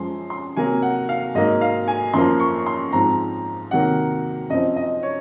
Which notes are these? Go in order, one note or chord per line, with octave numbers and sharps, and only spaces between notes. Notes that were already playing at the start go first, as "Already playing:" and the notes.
Already playing: F#2 F3 G#3 C6
C6
C3 F#3 A#3 G#5
F#5
F5
G#2 F#3 A#3 D#5
F5
G#5
F#2 F3 A#3 C6
C#6
C6
G#2 F3 C4 A#5
C3 D#3 F#3 A#3 F#5
F#2 F3 C4 D#5
D#5
C#5